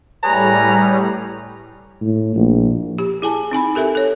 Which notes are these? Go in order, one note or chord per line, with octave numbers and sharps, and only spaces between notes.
A2 G3 G#4 B4 C#5 A#5
A2
A#1
G4
E4 G#4 G#5 A5
C4 D#4 G#5 B5
G4 A4 A#4 E5 G#5
A4 C#5